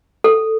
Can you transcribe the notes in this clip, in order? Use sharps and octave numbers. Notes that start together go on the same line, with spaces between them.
A4